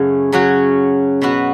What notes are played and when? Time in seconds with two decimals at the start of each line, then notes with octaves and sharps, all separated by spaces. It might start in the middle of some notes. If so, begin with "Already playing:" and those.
Already playing: F#2 C#3 A3 C#4 F#4
0.32 C#3 F#3 C#4 F#4
1.22 B2 B3 F#4